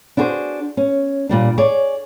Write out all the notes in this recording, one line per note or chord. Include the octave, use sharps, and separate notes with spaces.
D4 E4 F#4 G#4 C5
C#4
A#2 G3 D4
G#4 C#5 D5